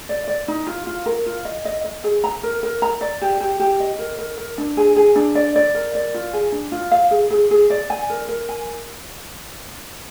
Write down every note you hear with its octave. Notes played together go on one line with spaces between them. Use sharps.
D5
D5
D#4
F4
F4
A#4
F4
D#5
D#5
D#5
G#4
A#5
A#4
A#4
A#5
D5
G4
G4
G4
D#5
A#4
A#4
A#4
D4
G#4
G#4
D4
D5
D5
A#4
D5
F4
G#4
D4
F4
F5
G#4
G#4
G#4
D5
G#5
A#4
A#4
G#5